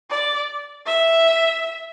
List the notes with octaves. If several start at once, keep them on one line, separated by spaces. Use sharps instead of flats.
D5
E5